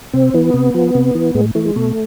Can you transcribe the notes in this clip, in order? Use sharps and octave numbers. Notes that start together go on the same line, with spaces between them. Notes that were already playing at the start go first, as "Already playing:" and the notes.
C3 C4
E3 B3
C3
F3
C3
E3
A2 G#3
E3 A3
G#3
B2 A3